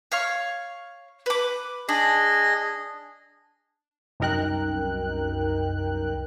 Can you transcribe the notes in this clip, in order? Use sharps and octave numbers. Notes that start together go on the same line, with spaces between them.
C#5 F5 C#6
B4 D6
D4 G#4 D#5
C2 F#2 D#4 A#4 G5 F#6